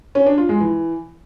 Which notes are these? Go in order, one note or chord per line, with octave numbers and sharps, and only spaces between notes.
C#4
D4
F4
G#3
E3